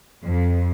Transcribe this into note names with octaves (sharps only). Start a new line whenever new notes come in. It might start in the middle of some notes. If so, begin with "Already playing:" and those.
F2